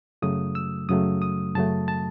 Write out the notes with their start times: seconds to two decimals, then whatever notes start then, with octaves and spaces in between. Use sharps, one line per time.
0.22 F#2 C#3 F#3 A3 D#6
0.55 E6
0.89 F#2 C#3 F#3 A3 D#6
1.22 D#6
1.55 F#2 C#3 F#3 A3 A5
1.88 A5